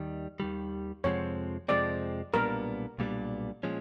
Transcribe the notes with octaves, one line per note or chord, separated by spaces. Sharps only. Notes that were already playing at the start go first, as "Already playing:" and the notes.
Already playing: D#2 D#3 G3
D#2 D#3 G3
F2 C3 F3 G#3 C4 C#5
F2 C3 F3 G#3 C4 D5
B1 A#2 G3 B3 D4 A#4
B1 A#2 G3 B3 D4
A#2 F3 G#3 C#4